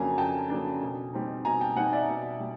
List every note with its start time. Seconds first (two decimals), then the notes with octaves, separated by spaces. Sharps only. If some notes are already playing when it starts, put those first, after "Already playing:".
Already playing: F2 C#3 F#3 A#3 D4 G#5 A#5
0.17 F2 G5 A5
0.50 C#3 F#3 A#3 D4
0.81 B2
1.13 G3 C4 D#4
1.45 B2 G#5 A#5
1.61 G5 A5
1.76 G3 C4 D#4 F#5 G#5
1.92 D5 E5
2.08 B2
2.40 G3